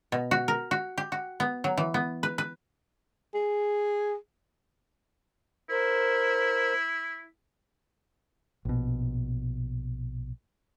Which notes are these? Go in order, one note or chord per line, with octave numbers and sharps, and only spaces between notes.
B2
F#4
A#4
F#4
G4
F#4
B3
F#3
E3
B3
B4
B4
G#4
E4 A#4 C5
A#1 B2